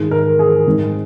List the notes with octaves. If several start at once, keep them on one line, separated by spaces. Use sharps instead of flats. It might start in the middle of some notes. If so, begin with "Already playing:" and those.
Already playing: G#2 D#3 G#3
A#4
G#4
G#2 G#3 C4 D#4